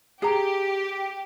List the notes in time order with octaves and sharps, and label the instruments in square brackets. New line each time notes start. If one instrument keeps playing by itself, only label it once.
[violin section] G4 [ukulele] G#4 A#5